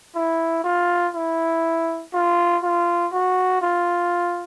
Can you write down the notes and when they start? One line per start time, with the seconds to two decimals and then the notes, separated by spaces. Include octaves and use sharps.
0.15 E4
0.64 F4
1.14 E4
2.13 F4
2.62 F4
3.12 F#4
3.62 F4